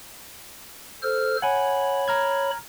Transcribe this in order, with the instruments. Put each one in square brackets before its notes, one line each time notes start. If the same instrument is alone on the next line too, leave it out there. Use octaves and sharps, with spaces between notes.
[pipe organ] A4 C5 F6
[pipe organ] C#5 B5 [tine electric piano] F#5 G#5
[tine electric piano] A#5 F6 G#6